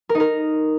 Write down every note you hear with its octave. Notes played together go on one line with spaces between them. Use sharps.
A#4
D#4
A#4